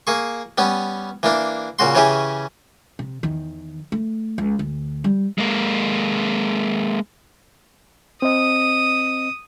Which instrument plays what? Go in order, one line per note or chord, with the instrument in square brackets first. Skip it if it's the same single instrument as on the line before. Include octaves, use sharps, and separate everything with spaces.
[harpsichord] A#3 G#4 C#6
G3 B3 C#4
E3 A#3 D4
A#2 C#3 F#4 C6
C#3 E3 C#4 G4 G#4
[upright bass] C3
E2 D#3
A3
C#2
D2
G3
[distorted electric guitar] G#3 A#3
[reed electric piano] C4 D#5 [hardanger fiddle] D#6